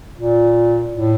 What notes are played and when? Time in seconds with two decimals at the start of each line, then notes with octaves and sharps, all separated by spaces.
0.15 A#2
0.94 A2